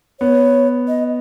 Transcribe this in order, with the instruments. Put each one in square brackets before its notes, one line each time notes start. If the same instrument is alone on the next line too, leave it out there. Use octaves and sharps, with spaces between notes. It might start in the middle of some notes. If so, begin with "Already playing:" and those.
[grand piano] B3 [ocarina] C#5
[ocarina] D#5